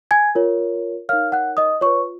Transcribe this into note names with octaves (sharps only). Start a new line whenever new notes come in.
G#5 G#6
F4 A#4 C#5
D#4 A#4 C#5 F5 F6
F#5 F#6
D#5 D#6
F4 B4 C#5 C#6